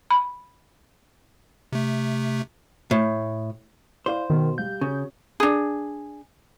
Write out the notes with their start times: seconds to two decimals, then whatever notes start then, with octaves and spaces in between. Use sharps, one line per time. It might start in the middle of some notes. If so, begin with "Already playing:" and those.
0.11 B5
1.72 C3 A3
2.91 A2
4.06 E4 C5 D5 F5
4.30 B2 D#3
4.58 G3 F5 G6
4.81 C#3 F#4 C#5
5.40 D4 G#4